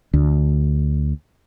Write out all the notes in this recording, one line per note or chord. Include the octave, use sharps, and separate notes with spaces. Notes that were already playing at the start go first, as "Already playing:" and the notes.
D2